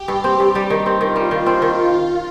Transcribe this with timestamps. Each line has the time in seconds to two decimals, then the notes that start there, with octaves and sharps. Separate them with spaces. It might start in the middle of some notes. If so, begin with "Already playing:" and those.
Already playing: G4
0.08 G2
0.24 C4
0.40 G2
0.55 G3
0.70 D#3
0.86 C4
1.01 D#3 F4
1.16 G3
1.31 D#3
1.46 C4 F4
1.62 D#3